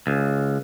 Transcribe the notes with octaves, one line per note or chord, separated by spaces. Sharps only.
C#2